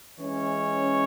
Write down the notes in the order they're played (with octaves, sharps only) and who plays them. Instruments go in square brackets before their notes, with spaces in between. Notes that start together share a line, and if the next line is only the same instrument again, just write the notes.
[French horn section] E3 G#3 C#4 [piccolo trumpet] C#5